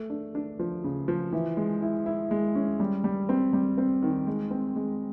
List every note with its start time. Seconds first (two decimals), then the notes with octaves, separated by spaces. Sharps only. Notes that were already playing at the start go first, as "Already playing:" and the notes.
Already playing: A3
0.10 D4
0.35 D4
0.59 F3
0.84 C#3
1.08 F3
1.33 E3
1.57 G#3
1.82 E4
2.06 E4
2.31 G#3
2.55 C#4
2.80 G3
3.04 G3
3.29 C4
3.53 G3
3.78 C4
4.03 D#3
4.27 G#3
4.51 C4
4.76 G#3